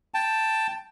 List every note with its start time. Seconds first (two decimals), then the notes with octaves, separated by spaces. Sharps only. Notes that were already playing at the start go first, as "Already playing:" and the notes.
0.14 G5 A5